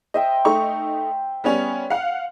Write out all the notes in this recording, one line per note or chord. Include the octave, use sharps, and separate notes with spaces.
C5 D#5 E5 G5
A3 D#4 C#6
G3 B3 C#4
F5 F#5